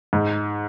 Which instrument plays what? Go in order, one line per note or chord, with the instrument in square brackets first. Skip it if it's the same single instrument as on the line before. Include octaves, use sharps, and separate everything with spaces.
[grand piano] G#2